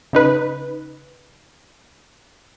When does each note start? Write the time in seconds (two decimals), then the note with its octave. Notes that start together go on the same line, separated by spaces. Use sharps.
0.13 C#3 D#4 B4